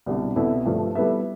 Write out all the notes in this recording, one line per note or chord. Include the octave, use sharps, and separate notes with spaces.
C2 B2 G3 D4
C2 B2 B3 E4 A4
G2 F3 A3
G3 B3 E4 A4 E5